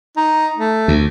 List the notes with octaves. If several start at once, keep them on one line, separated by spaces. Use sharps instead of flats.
D#4
A3
D2